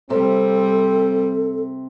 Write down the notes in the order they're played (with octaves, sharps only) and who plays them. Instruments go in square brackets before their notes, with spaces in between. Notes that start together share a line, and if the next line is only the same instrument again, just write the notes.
[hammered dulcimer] C3 [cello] G3 [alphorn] C4 [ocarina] A4